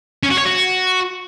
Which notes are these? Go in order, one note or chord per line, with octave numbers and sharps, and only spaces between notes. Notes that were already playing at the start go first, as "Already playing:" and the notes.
C#4
F#4
C#5
F#4